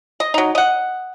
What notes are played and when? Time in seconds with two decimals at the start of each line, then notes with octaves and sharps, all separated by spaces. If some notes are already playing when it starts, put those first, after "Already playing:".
0.20 D#5
0.34 F#3 D#4
0.55 D#5 F#5